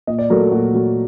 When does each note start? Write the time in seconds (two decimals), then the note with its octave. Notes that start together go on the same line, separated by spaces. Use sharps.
0.07 A#2 D#5
0.19 D5
0.30 F#3 A3 A#4
0.41 A4
0.52 A#2 F#4
0.74 F#3 A3